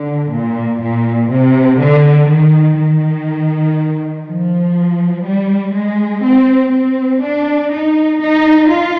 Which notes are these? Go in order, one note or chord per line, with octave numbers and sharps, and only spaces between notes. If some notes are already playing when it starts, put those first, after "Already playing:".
Already playing: D3
A#2
A#2
C3
D3
D#3
D#3
F3
G3
G#3
C4
C4
D4
D#4
D#4
F4